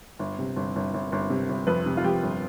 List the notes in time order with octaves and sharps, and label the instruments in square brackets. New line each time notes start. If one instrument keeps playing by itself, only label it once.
[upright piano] G1
C3
G1
G1
G1
G1
C3
G1
F2 B4
C3
F4
F2 G4
G1